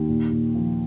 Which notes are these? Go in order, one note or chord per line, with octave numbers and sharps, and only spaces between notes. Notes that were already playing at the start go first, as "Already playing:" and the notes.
Already playing: D#2
A#2
A#2
F3